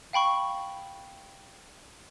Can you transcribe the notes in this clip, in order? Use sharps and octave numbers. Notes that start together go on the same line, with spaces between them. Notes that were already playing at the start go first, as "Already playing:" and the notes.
F5 G5 B5 C#6